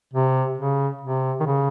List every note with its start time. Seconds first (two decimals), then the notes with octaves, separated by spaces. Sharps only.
0.14 C3
0.58 C#3
1.01 C3
1.40 D#3
1.46 C#3